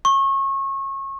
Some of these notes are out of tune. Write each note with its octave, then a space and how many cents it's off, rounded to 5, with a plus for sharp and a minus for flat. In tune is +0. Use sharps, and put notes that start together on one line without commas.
C#6 -30